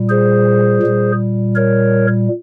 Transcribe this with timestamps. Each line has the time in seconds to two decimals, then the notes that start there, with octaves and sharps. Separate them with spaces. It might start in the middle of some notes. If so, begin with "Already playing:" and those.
Already playing: A#2 G3
0.09 G#4 C5
0.82 A#2 G3
1.56 A#4 C#5